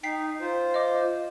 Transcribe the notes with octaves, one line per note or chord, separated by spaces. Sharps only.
D#4 G5 B6 C7
F4 C5
D#5 D6